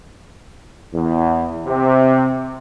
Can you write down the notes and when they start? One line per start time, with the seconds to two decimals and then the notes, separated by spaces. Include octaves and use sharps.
0.94 E2
1.66 C3